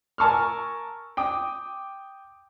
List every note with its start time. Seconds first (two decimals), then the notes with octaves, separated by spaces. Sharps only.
0.18 A#4 G#5 A5 C#6 E6 F6
1.17 G5 D6 D#6